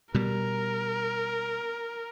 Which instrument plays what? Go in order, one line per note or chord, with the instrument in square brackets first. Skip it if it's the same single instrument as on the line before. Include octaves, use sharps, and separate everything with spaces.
[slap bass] B2 G3 [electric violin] A#4